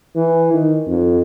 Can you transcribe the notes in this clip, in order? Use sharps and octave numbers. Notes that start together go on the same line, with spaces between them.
E3
D#3
F2